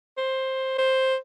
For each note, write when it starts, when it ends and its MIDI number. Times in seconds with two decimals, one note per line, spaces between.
0.17 0.75 72
0.78 1.16 72